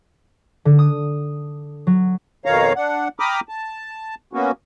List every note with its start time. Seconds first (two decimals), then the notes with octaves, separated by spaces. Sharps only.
0.65 D3
0.79 D#6
1.87 F#3
2.45 F2 B2 D#3 C#5 F5 A#5
2.76 D4 F#5
3.19 G5 A#5 B5 D6 D#6 F6
3.49 A5
4.33 A#3 B3 C#4 F#4